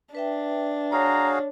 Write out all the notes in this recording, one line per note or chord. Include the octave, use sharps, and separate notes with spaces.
D4 B4 E5 G5
F#4 G#4 C#5 F5 A#5